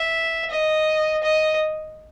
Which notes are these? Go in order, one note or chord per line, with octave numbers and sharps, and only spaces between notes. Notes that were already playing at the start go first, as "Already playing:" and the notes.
Already playing: E5
D#5
D#5